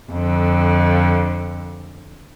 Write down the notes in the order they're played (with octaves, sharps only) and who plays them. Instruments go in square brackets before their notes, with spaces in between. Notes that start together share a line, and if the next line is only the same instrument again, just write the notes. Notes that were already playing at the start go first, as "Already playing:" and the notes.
[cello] F2 D3